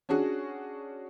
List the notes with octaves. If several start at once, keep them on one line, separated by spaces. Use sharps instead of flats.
C#4 D4 F#4 G#4